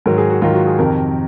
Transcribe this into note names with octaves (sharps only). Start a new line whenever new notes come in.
G#2 D#3 F#3 A#4
G#4
F#4
G#2 D#3 F#3 F4
F#4
G#4
F2 C3 D#3 A#4